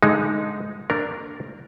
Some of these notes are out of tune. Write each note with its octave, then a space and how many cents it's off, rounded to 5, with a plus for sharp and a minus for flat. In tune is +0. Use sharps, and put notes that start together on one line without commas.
D3 +0 G#3 +0 D#4 +0
A#3 -35 D4 +0 A#4 +0